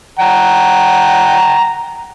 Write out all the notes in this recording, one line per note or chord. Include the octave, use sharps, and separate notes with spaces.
F#5 G5 A#5